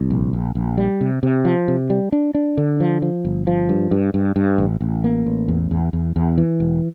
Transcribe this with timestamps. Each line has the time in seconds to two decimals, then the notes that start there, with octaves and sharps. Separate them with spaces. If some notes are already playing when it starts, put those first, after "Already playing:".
Already playing: C2
0.10 A#1
0.33 A#1
0.55 A#1
0.78 G3
1.01 C3
1.23 C3
1.45 F3
1.68 C3
1.90 G3
2.12 D4
2.35 D4
2.57 D3
2.80 F3
3.02 F3
3.25 G1
3.47 F3
3.69 G2
3.91 G2
4.14 G2
4.36 G2
4.58 A1
4.81 A1
5.04 A#3
5.26 A1
5.48 E2
5.71 E2
5.93 E2
6.16 E2
6.38 E3
6.60 E1